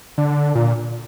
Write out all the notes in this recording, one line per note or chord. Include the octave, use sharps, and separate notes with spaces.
D3
A#2